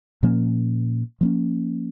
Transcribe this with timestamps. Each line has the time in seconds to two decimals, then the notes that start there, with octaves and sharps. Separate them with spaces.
0.23 A#2 F3 A#3 C#4
1.21 F3 A#3 C#4